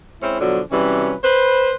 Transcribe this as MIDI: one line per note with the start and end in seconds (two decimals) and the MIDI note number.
0.22 0.38 56
0.22 0.38 60
0.22 0.38 61
0.22 0.38 64
0.40 0.60 47
0.40 0.60 50
0.40 0.60 53
0.40 0.60 54
0.72 1.14 48
0.72 1.14 52
0.72 1.14 54
0.72 1.14 55
0.72 1.14 61
0.72 1.14 71
1.24 1.76 71
1.24 1.76 72